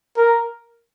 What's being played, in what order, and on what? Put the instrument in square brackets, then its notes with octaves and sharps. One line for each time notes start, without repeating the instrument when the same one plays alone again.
[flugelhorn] A#4